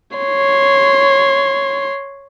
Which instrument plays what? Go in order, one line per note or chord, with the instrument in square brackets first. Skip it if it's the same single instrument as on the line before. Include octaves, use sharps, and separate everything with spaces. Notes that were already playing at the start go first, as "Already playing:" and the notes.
[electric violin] C#5 C6